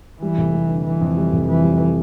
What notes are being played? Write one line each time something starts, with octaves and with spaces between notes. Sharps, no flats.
E3 G3
F1
G3
D3
D3 E3
F2
G3
F1
F2 E3
G3